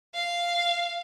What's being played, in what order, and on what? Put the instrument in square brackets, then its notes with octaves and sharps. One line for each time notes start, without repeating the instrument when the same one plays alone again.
[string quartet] F5